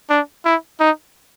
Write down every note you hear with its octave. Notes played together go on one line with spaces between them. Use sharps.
D4
E4
D#4